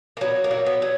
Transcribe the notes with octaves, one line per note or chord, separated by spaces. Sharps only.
A#3
F#3 B3
A#3
F#3
B3
F#3